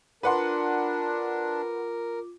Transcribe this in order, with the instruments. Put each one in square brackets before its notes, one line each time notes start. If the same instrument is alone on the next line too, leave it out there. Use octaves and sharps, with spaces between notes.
[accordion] D4 [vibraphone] F4 D6 [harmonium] A#4 [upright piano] B4 F#5 C6